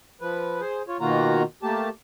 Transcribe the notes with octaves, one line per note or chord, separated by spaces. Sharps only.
F3 B4
G#4 C5
F4 C#5
B2 D#3 A#3 F4 F#4 A#5
A3 A#3 G4 A5